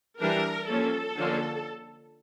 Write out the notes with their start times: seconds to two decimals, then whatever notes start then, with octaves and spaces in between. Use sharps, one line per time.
0.20 E3 G3 D4 A#4
0.68 F3 A#3 C#4 A4
1.17 D3 F3 A#3 C#4